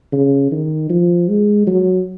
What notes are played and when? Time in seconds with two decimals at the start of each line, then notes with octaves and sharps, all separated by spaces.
0.13 C#3
0.52 D#3
0.89 F3
1.29 G#3
1.67 F#3